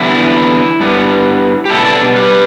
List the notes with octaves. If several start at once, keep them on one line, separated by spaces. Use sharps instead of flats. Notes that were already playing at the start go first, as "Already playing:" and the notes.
Already playing: E2 D3 G3 B3 E4
G2 G3 B3
G4
B2 G3 B3 E4 A4
A4 D5
G4 B4